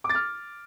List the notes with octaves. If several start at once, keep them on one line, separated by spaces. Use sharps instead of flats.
D6
A6
F6